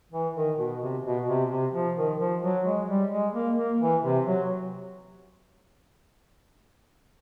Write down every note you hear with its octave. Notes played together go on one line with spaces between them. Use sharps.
E3
D#3
B2
C3
B2
C3
C3
F3
D#3
F3
F#3
G#3
G3
G#3
A#3
A#3
E3
C3
F#3